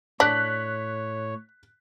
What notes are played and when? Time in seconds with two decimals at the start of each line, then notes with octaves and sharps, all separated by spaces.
0.20 A2 D4 C#5 F#6 B6